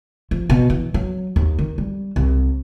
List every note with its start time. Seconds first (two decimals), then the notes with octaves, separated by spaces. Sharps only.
0.31 F3
0.50 B2
0.70 E3
0.94 F#3
1.36 D#2
1.59 D#3
1.78 G3
2.16 C2